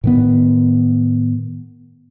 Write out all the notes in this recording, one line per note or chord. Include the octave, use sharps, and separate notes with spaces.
A2 D#3 B3